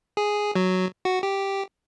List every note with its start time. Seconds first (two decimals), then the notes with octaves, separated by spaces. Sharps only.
0.17 G#4
0.55 F#3
1.05 F#4
1.23 G4